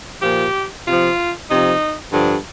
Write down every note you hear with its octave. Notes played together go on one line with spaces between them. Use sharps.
A#2 F3 G4
C3 F3 F4
C3 F3 D#4
G2 D3 F3 D4